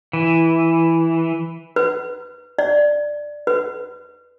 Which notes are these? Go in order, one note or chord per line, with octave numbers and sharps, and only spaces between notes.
E3
B4
D5
B4